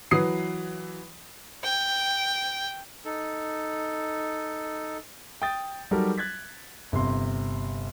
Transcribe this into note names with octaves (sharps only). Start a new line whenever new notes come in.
E3 F#3 B4 D#6 C7
G5
D#4 A4
G5 D#6 G6 A6
F#3 G3 D#4 G4 A4 A#4
F#6 G#6 A6 B6
G1 C3 C6